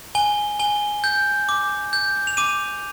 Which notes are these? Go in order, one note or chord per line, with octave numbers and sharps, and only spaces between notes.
G#5 G7
G#5 G7
G6
D6
G6
F7
D6 D#7